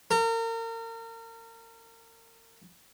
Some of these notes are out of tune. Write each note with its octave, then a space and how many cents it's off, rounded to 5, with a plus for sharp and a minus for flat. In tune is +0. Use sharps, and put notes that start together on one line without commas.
A#4 -35